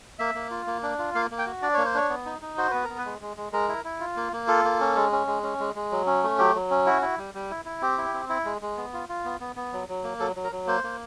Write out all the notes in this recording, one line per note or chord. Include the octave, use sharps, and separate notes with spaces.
A#3 E5
A#3
F4
A#3
D4
F4
A#3 F5
A#3
G5
F#4
D4 D5
A#3 C#5
C5
D4 C#5
B3
D#4
D#4
F#4 C5
B3 B4
B3 A#4
B4
G#3
G#3
G#3
G#3 A#4
E4
E4
F4
A#3
A#3
F4 A4
A#3
C#4
G#3
C#4
G#3
C#4
G#3
G#3
F#3
C#4
A3
F#3 G4
F#3
C#4
E4 F#4
E4
G3
G3
E4
E4
C4 G4
E4
C4
E4
G#3
G#3
B3
F4
F4
B3
B3
B3
F#3
F#3
A#3
F#3 A4
F#3
A#4
F#3
A#3 C5
A#3